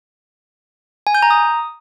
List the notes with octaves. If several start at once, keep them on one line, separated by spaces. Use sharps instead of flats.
G#5
G6
A#5
D#6